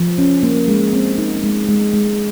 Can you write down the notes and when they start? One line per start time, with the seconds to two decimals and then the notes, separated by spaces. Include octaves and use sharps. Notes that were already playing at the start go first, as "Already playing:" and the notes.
Already playing: F3
0.18 C#4
0.43 A#3
0.68 G#3
0.93 C4
1.18 D#4
1.44 G#3
1.69 G#3
1.94 G#3